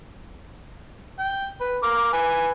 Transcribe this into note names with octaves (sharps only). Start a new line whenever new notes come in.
G5
B4
A#4 D6
B4 G#5